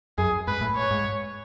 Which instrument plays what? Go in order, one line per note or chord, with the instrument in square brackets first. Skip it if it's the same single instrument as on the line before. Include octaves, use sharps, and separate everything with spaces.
[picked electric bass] F#2 [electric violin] G#4
[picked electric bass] G#2 [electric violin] B4
[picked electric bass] A2
[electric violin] C#5
[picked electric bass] G#2